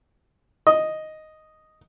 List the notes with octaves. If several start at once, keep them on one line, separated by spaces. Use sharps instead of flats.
D#5